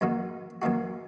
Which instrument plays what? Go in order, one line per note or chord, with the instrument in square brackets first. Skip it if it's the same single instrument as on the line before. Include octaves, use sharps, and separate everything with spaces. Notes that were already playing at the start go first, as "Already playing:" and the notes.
[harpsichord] F#2 D#3 A#3 D#4 F#4
F#2 D#3 A#3 D#4 F#4